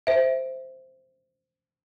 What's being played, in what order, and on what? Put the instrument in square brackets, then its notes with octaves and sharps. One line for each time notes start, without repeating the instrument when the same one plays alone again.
[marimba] C5 E5